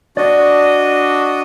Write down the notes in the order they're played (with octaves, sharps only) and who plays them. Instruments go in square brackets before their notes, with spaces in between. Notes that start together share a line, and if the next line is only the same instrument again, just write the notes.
[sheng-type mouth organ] D4 F#4 D#5 [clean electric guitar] D5